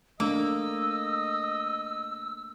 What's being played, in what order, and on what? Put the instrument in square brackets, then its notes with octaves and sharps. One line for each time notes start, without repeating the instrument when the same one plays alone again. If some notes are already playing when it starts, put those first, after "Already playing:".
[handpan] A3 D4 [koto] A#3 [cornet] D#5 [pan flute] E6